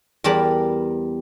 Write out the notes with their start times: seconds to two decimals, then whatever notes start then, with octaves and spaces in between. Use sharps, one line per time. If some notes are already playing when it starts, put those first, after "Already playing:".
0.24 E2 G3 A#4 A5 B5